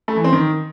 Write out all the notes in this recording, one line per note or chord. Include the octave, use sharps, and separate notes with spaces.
A3
E3
C4
D#3